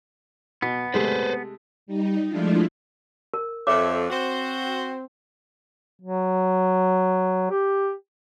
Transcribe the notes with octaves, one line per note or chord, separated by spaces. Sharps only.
B2 B3
C3 G#3 A3 B4 C5
G3 D#4
F3 G#3 A3 D4 E4 F4
A#4
F2 A4 C#5 E5 D6
C4 F#4 C5
F#3
G4